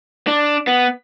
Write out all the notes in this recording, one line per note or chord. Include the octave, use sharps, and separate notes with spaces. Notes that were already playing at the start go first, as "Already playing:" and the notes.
D4
B3